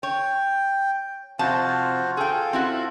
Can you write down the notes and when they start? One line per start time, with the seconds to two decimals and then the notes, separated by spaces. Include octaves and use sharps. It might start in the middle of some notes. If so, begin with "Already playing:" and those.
0.03 C#5 G5
1.39 F2 C3 F4 F#4 C5 A5
2.17 F4 G#4 A4 G5
2.53 C4 E4 F#4